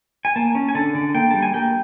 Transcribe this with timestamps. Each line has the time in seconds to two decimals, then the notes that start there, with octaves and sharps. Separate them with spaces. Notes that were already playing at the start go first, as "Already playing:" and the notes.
0.25 G#5
0.36 A#3 A5
0.55 C#4
0.69 G#5
0.75 D3 A5
0.95 D3
1.14 A#3 G5
1.31 G3 A5
1.42 G#5
1.54 A#3 G5